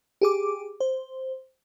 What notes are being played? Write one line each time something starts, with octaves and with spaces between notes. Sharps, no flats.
G4 G#4 D6
C5